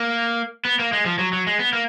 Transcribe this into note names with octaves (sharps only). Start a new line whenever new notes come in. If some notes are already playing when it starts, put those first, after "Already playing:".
Already playing: A#3
B3
A#3
G#3
F3
F#3
F#3
G#3
B3
A#3